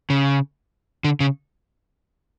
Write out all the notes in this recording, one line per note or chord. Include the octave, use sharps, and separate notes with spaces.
C#3
D3
C#3